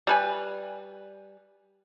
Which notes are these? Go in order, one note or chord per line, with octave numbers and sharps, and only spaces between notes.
G3 B4 G#5